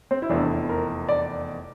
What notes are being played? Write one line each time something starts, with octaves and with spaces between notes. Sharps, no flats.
C4
E4
F1 E2 E3 D4
A#4
D5